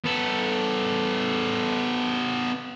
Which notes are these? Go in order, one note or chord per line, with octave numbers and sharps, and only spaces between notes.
B3 A4